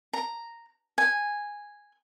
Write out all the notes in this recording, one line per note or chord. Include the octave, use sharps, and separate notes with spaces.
A#5
G#5